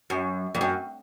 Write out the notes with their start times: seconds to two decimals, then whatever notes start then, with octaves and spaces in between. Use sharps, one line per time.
0.10 F#2
0.55 F2
0.61 F#2